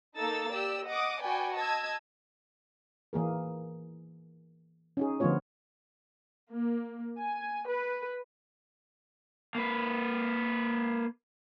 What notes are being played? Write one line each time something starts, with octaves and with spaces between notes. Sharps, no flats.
A#3 D#4 A4 E6 A6
G4 D5 E6
D#5 F#5 D6 D#6
F#4 B4 D5 G5 G#5
D#5 A5 E6 G#6
E3 A#3 G#4 A#4
C#4 D#4 G#4
D3 F3 A3 B3 F4 C#5
A#3
G#5
B4
A#3 B4